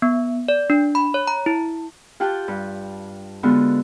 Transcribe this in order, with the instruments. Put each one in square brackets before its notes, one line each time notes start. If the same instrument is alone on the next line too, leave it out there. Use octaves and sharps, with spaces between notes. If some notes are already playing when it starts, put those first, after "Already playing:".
[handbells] B3
D5
D4
B5
C#5
A#5
E4
[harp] F4 G4 F#5 G5 A5
G2
D3 G#3 B3 F4 F#4